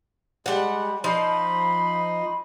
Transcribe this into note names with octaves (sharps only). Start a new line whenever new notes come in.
G3 G#3 F#5
F3 D#4 D#5 B5 C6